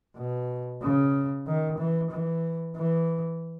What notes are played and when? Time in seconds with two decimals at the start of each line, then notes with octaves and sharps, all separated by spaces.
0.17 B2
0.82 C#3
1.47 D#3
1.78 E3
2.11 E3
2.76 E3